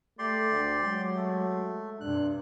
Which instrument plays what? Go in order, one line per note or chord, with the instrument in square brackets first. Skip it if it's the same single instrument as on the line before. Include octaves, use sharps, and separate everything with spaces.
[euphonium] A3 [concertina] G4 D5 C6
[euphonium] D2
[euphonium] F#3 [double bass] G#3
[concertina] A3
[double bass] G2 C3 [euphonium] D4 [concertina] F#6